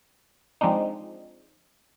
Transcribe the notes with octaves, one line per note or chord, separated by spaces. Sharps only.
F3 G#3 C4 D4 D#4